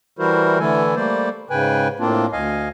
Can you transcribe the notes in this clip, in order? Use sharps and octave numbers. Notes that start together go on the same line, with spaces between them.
E3 G3 E4 F#4 A#4 C5
D3 E3 A3 E4 A4 G#5
G3 A3 A#3 C5 D5
G#2 C#3 B4 G5 G#5
A2 A#3 C4 D4 F4
D2 D#5 F5 G#5